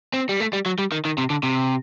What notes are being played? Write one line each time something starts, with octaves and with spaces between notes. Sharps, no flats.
C4
G3
A3
G3
F#3
G3
D#3
D#3
C3
D3
C3